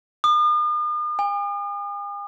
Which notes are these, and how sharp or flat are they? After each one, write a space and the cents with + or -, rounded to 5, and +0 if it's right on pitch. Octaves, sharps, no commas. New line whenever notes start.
D#6 -45
G#5 -45